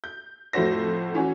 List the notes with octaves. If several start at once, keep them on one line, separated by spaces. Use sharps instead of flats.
G6
F2 A2 A3 F#4 C5 A#6
E3 C#4 F#4